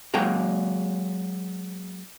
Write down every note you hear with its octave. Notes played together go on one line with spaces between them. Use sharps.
F#3 G#3 A#3 G5 A#5